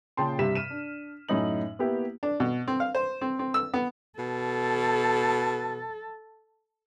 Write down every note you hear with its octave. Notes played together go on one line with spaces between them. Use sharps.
A#2 C#3 G5 A5 C6
G2 C3 B6 E7
F6 D#7 E7
D4
F#2 A2 C#4 D#4 F#7
A#3 B3 E4 G4
D4
B2
C4
F5
C5
C4
C4
E6
B3
B2 A4